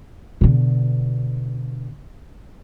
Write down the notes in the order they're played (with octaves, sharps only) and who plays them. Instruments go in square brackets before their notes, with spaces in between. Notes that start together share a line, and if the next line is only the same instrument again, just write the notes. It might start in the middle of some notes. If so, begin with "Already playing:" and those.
[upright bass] B2 D3